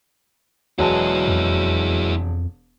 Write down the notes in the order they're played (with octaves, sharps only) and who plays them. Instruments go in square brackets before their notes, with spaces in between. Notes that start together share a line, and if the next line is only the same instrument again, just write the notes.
[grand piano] E1 A5 [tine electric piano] F#3 G#3 B4 [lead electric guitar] E4 G#4
[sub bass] F2